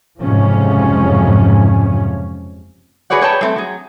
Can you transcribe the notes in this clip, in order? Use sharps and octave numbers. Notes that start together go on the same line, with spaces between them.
F#1 F2 G#2 C3 F3 C#4
F#4 G#4 B4 C#5 D5 F#5
G#4 B4 C#5 D5 G5 A5
G3 A3 C4
F#3 G#4